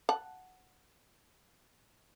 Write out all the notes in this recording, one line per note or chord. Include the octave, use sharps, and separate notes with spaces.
F#5 A5